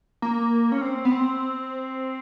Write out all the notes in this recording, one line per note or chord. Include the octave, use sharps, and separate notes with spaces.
A#3
C#4
C4
B3
C4